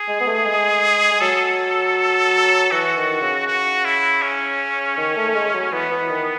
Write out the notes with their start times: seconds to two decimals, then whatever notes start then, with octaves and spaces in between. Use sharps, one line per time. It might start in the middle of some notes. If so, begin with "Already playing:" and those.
Already playing: G#4
0.08 G#3
0.20 B3
0.27 A3
0.45 G#3
1.12 G#3
1.21 F#3 A4
2.71 E3 F#4
2.97 D#3
3.22 C#3
3.47 F#4
3.85 E4
4.22 C#4
4.97 D#3
5.16 A3
5.28 A3
5.35 G#3
5.54 F#3
5.72 E3 B3
5.91 E3
6.10 D#3